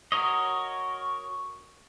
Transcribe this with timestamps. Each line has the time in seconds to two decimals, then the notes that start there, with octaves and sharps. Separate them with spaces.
0.12 F#4 A#4 C#5 D#5